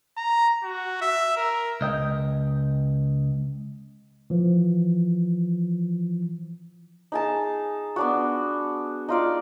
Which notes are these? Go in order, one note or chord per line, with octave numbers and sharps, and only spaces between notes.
A#5
F#4
E5
A#4
C#2 D#5 G5
E3 F3
D#4 G#4 A5
B3 D4 F#4
D#4 F4 D5